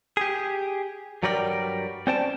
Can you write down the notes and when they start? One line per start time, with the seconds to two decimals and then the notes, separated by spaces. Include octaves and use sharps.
0.17 G4 G#4
1.23 G2 F#3 G3 A#4 D5 G5
2.07 C4 C#4 C5 D5 G5 A5